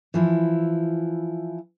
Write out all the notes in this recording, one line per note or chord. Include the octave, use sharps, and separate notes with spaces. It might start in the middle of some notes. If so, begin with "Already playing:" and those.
E3 F3 E4